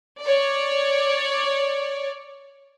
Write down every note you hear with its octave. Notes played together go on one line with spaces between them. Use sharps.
C#5 D5